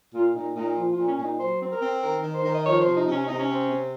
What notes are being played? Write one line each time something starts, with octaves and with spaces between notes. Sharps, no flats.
A#2 F4
A#2 D#4
A#2 D#4
F3 F4
A#2 F4
C#4
A#2 D#4
F#3 C5
C4
A#4
C4
D#3 A#4
D#3
C5
D#3
D#5
F3 C#5
C5
C3
D#4
C3
C#4
C3 D#4
C#4
C4
C3